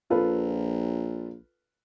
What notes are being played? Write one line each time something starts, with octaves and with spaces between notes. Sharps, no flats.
A#1 F4 A4 B4